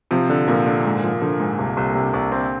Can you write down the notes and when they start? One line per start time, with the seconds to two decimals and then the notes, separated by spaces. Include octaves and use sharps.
0.11 C3 F3
0.29 D3
0.48 A#2 F3
0.66 D3
0.85 G#2
1.03 F3
1.21 D3 F3
1.40 G#2
1.59 C2
1.77 C2
1.95 C3
2.13 C2
2.32 C4